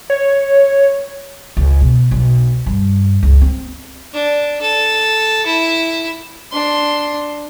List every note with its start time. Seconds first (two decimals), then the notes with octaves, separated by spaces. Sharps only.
0.10 C#5
1.57 C#2
1.81 B2
2.11 B1
2.66 G2
3.23 C#2
3.41 C4
4.13 D4
4.62 A4
5.46 E4
6.52 D4 C6